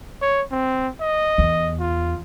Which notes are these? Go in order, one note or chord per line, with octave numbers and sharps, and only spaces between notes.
C#5
C4
D#5
E2
F4